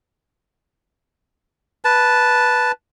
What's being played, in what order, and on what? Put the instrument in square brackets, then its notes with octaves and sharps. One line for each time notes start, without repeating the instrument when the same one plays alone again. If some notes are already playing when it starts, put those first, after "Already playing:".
[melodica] B4 A5